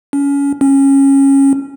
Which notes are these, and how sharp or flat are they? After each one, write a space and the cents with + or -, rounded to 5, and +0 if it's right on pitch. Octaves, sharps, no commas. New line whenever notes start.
C#4 +25
C#4 -15